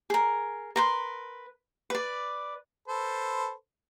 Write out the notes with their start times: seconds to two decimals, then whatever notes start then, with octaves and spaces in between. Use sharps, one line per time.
0.10 G#4 A#4
0.76 A#4 B4 C6
1.90 B4 D5
2.88 A4 B4 C5